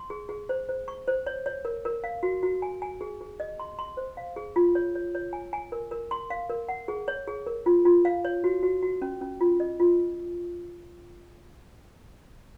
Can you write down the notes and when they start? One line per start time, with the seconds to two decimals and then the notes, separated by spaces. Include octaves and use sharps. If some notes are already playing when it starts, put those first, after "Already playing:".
Already playing: C6
0.10 G#4
0.29 G#4
0.49 C5
0.69 C5
0.88 C#6
1.08 C5
1.27 C#5
1.46 C#5
1.65 A#4
1.85 A#4
2.04 F5
2.23 F#4
2.43 F#4
2.62 G#5
2.82 G#5
3.01 G#4
3.21 G#4
3.40 D#5
3.60 C6
3.79 C6
3.97 C5
4.17 F5
4.36 G#4
4.56 F4
4.75 C#5
4.95 C#5
5.15 C#5
5.33 G#5
5.53 G#5
5.72 A#4
5.91 A#4
6.11 C6
6.30 F5
6.50 A#4
6.69 F#5
6.88 G#4
7.08 C#5
7.27 G#4
7.46 A#4
7.66 F4
7.85 F4
8.05 F5
8.25 C#5
8.44 F#4
8.63 F#4
8.83 F#4
9.02 C#4
9.21 C#4
9.41 F4
9.60 D#5
9.80 F4